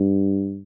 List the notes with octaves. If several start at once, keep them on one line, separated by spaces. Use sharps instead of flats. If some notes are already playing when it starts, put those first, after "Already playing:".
Already playing: G2